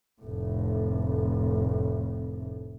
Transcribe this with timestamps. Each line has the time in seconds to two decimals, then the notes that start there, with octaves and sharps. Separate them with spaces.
0.21 F1 A2